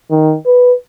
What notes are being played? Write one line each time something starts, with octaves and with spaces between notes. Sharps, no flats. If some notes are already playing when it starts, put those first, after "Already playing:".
D#3
B4